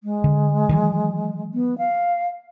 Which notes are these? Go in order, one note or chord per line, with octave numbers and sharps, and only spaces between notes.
G#3
D3
D#3 E3 F#3
B3
F5